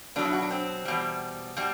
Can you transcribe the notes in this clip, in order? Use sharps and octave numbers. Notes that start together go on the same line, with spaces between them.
B2 F#3 D4
E4
F#4
D4
C4
E2 B2 G3
B2 G3